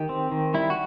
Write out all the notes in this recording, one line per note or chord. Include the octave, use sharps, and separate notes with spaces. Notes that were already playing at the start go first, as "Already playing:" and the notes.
Already playing: D#3 G4
C4
D#3
G3 E4
F#4